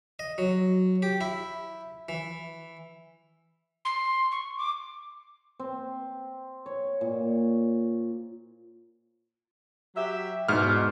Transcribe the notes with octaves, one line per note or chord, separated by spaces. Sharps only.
D#5
F#3
G4
E4
E3
C6
C#6
D6
C4
C#5
A#2
F#3 G4 E5
E2 G#2 B2 F6